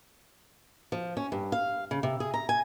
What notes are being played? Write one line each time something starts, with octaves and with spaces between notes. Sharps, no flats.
F3
C#4
G2
F5
C#3
C3
G#4
A#5
G#5